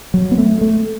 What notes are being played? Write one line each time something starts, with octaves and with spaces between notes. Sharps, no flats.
F#3
B3
A3
A3